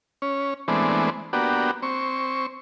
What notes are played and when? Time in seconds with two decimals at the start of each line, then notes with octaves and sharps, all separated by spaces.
0.22 C#4
0.68 E3 G#3 A3 B3 C4 D4
1.33 A#3 B3 D4 F#4 G4
1.83 C4 C#6